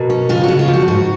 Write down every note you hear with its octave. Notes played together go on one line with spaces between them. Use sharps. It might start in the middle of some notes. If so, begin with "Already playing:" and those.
Already playing: B2 F#4 A#4
C#4
C#3 F4 G#4
C#3 F#4
F4
F3
F#4
G#2 F#4